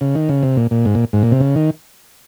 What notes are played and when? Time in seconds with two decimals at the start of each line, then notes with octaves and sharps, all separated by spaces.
0.01 C#3
0.15 D#3
0.29 C#3
0.43 C3
0.57 A#2
0.71 A#2
0.85 G#2
0.95 A#2
1.13 G#2
1.23 A#2
1.31 C3
1.40 C#3
1.56 D#3